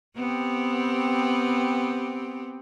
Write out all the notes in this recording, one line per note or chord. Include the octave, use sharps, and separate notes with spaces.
B3 C4 G4